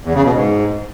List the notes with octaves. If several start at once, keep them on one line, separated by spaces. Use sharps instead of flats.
E2
C#3
B2
G#2